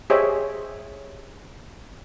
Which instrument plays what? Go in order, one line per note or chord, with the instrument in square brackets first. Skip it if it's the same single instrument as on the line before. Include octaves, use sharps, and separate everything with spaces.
[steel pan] G4 G#4 C5 C#5 D#5 E5